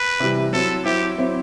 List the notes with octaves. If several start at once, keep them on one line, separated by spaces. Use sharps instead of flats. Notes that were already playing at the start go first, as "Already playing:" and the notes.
Already playing: B4
C3 E3 G3
F#3 C4 E4 A4
F#3 C4 E4 G4
F#3 C4 E4